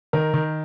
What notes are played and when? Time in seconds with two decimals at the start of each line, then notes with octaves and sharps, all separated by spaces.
0.13 D#3 A#4
0.34 D#3